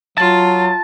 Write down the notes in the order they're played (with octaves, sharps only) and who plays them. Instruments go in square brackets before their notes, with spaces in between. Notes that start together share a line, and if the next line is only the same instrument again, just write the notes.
[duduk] F#3 [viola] F4 [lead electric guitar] A5